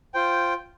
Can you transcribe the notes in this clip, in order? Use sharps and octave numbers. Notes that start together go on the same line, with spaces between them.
F4 C5 G5